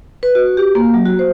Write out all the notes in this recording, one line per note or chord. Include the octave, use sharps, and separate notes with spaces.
B4
F#4
G4
A#3
F#3
F#4
C5